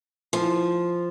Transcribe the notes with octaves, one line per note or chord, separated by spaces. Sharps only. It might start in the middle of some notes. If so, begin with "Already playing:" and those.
F3